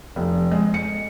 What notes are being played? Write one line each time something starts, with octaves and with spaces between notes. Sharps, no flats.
F1
G#3
C#7